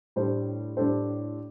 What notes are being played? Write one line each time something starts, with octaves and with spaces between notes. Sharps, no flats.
A2 G3 D4 A4 C5
A2 G3 D4 A4 C5